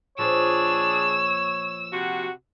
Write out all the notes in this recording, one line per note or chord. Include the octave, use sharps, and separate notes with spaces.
A#2 F3 A#3 D4 G#4 C#5 E6
C3 F#4